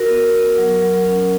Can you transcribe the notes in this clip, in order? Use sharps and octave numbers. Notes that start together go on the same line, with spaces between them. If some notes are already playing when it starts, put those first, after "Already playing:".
Already playing: F#4 A#4
B3
B3
F#3
F#3
C#4